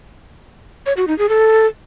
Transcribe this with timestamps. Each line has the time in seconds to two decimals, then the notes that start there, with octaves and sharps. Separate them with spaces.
0.86 C#5
0.97 F#4
1.08 D#4
1.18 G#4
1.29 A4